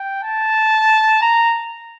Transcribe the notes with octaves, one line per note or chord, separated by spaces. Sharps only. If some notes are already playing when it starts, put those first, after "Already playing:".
Already playing: G5
A5
A#5